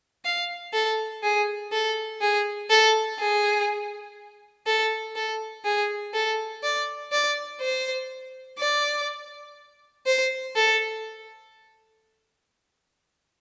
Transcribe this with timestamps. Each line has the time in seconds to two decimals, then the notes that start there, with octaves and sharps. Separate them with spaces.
0.25 F5
0.73 A4
1.23 G#4
1.72 A4
2.21 G#4
2.70 A4
3.19 G#4
4.66 A4
5.16 A4
5.64 G#4
6.14 A4
6.63 D5
7.12 D5
7.61 C5
8.59 D5
10.06 C5
10.55 A4